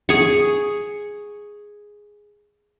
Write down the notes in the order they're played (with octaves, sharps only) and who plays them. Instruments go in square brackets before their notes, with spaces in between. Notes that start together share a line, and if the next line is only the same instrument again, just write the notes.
[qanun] G#4 C#6